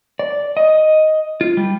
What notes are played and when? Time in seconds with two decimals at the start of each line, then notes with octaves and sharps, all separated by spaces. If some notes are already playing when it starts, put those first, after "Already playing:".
0.19 D5
0.57 D#5
1.41 F4
1.57 G3